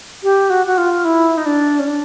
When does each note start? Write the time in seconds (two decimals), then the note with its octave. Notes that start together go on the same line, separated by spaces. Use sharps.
0.23 G4
0.50 F#4
0.67 F#4
0.78 F4
1.05 E4
1.37 D#4
1.46 D4
1.79 C#4
1.87 D4